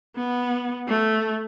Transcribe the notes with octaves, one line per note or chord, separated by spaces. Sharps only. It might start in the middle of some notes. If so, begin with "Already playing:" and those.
B3
A3